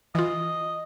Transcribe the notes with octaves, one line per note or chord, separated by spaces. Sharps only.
E3 F4 D#5